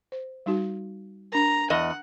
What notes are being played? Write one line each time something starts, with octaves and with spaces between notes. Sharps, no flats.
C5
G3 D#4 F#4
D4 A#4 A#5
E2 D#5 F#5